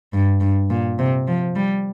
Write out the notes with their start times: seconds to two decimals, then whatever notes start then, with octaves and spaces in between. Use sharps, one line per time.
0.13 G2
0.41 G2
0.70 A#2
0.99 C3
1.27 F3
1.56 G3